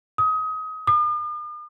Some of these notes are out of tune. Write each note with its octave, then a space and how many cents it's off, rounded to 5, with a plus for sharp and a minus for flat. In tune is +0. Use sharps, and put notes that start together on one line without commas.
D#6 +25
D#6 -45